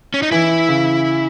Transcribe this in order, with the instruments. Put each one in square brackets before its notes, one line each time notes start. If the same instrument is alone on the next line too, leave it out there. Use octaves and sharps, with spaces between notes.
[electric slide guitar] C#4
D#4
[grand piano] E3 [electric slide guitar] E4
[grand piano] C#3